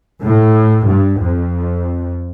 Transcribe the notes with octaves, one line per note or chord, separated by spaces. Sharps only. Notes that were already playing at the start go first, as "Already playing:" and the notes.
A2
G2
F2